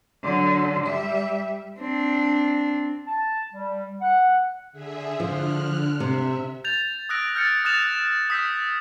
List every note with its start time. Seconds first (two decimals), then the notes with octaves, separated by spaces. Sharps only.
0.23 D3 F#3
0.83 G3 E5
1.80 C4 D4
3.07 A5
3.54 G3
4.02 F#5
4.72 D3 G#4 E5
5.20 D3 F3 F6 F#6
6.00 C3 E5
6.64 G6 A6 F7
7.09 D#6 E6 F#6 A#6 D7
7.35 F6 G6 A6 C#7 D7
7.65 D#6 F#6 A6 E7 F7
8.30 D#6 E6 G6 B6